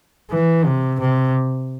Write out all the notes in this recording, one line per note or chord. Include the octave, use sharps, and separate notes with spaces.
E3
C3
C3